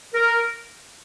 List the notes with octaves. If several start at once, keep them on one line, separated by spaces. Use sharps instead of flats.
A#4